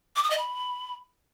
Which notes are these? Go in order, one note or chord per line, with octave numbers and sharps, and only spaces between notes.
D6
D#6
D#5
B5